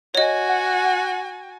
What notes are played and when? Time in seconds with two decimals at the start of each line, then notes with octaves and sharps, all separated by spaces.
0.15 F#4 C#5 D#5 G#5
0.49 F#5